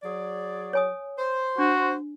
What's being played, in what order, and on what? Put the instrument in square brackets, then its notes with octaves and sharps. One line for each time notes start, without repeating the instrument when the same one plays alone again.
[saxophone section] F#3 G#4 D5
[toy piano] C#5 G#5 D#6
[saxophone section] C5
[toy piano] D4 [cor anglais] F#4